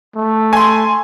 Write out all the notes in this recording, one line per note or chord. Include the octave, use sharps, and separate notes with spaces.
A3
G#5 C6